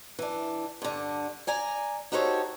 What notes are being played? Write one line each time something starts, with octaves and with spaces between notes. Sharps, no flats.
E3 D4
G2 D3
D5 G#5 A#5
D#4 F#4 G4 A4 C5 C#5